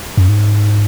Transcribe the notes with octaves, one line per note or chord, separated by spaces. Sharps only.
F#2
G#2